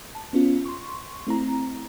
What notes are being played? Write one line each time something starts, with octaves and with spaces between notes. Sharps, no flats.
A5
B3 C#4 F4
C6 C#6
A3 C4 E4 A#5